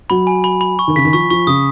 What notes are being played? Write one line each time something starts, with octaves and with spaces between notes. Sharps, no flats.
F#3 B5
G#5
B5
B5
C#6
D#3
C#3 B6
D#3
F3 C#6
F3 C#6
C#3 D#6